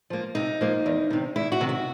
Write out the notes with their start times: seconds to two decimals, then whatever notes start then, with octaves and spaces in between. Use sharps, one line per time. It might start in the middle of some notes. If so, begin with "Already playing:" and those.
0.10 F3 A#3
0.35 C3 D#4
0.61 F3 A#3
0.86 E2
1.11 C3 D#3
1.36 E2 E4
1.52 F#4
1.61 C3 D#3
1.69 F#4